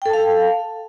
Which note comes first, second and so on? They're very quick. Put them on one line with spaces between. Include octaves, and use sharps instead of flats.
G5 A4 A5 F5